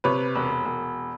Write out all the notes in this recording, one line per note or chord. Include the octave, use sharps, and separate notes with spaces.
C3 B4 C#5
E1
E1